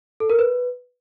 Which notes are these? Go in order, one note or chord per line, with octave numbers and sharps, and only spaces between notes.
A4
A#4
B4